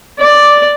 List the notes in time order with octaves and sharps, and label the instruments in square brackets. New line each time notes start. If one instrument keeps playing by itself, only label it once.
[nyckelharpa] D5